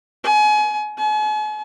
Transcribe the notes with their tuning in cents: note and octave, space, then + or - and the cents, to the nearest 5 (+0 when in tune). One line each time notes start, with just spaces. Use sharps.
G#5 +30
G#5 +45